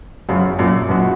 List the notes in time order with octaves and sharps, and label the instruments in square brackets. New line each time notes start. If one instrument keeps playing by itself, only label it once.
[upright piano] F#2 [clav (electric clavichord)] C#3 F3 B3
[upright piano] F#2 A#2
[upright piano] F#2 [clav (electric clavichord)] B2 G#3 B3 F#4